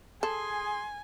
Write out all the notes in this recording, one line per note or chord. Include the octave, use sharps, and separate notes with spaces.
G#4 A4 G#5 C6